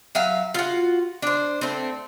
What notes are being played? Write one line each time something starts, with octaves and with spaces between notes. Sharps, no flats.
F#3 E5 F5
F4 F#4
D4 C5
A3 C4